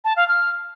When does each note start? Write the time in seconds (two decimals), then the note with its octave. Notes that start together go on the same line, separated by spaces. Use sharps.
0.05 A5
0.16 F5
0.28 F6